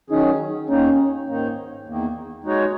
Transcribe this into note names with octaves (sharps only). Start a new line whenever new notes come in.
D#3 F#3 C#4 D#4 G#4
D#2 D#3 A#3 C#4 D#4
G#2 D#3 A#3 D#4
E2 D#3 A#3
G#3 D#4 F#4 C#5